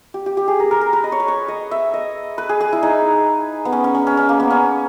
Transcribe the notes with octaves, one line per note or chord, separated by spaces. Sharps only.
G4
G4
G4
G#4
A#4
A#4
A#4
B4
D#5
C#5
B4
C#5
D#5
E5
D#5
B4
G#4
G#4
E4
D#4
B3
C#4
C#4
C#4
C#4
C#4
A#3
B3
C#4